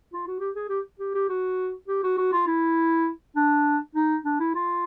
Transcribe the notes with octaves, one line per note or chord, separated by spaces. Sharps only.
F4
F#4
G4
G#4
G4
G4
G4
F#4
G4
F#4
F#4
F4
E4
D4
D#4
D4
E4
F4